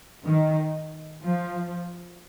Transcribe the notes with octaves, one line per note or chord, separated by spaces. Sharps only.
D#3
F3